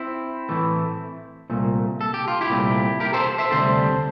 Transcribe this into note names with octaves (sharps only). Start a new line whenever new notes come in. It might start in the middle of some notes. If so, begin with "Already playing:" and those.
Already playing: C4 E4
A2 E3 A3
C2 A#2 A3
A4
G4
F4
E4 G4
C2 A#2 A3
G4 A#4
A4 C5
C5 E5
D2 C3 G3 A4 C5